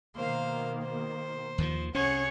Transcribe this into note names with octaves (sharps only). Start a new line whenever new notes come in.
B2 D#3 A#3 C5 F5
C5
D#2 D#3 F3
C2 C#4 G#4 C#5 F#5